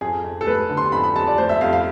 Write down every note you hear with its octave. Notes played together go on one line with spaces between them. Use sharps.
F2 G#4
F2
A4
A3 B4
D3
C6
F2 B5
B5
F2 A5
D5
A3 C5
E5
F2 F5
F5